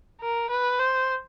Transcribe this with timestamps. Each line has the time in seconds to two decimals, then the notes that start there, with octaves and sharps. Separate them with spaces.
0.21 A#4
0.50 B4
0.79 C5